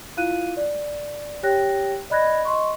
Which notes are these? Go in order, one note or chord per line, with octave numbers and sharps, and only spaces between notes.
E4 F4 F5 F#6 D#7
D5
G4 C#5 G5 F#6 A#6
D5 D#5 B5 F#6 G#6 A#6
D#5 C6 C#6